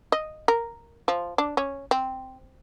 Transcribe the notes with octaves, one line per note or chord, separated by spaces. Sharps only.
D#5
A#4
F3
D4
C#4
C4